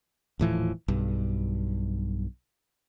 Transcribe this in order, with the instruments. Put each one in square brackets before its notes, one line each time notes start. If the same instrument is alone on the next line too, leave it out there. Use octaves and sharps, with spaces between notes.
[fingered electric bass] D#1 A2 E3 F3
B1 G2